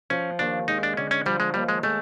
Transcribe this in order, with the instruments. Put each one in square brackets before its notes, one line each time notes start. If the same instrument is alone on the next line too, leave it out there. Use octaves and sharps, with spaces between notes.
[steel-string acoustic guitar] F3 [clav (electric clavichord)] C#4
[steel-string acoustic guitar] D#2 [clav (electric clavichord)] D4
[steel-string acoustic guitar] G#3 [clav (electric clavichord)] D#4
[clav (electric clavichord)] D4
[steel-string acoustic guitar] D3 [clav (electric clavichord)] C#4
[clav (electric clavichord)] C#4
[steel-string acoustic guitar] F3 [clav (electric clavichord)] G3
[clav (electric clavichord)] G#3
[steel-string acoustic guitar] D#2 [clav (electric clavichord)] G3
[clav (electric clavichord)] G#3
[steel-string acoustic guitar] G#3 [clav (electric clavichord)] A3